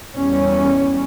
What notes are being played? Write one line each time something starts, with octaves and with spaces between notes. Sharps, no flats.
E2 G3 C#4